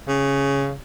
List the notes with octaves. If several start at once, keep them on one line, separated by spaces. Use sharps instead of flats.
C#3